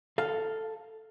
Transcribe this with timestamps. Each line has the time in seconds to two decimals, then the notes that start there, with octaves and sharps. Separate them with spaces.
0.18 A4 F5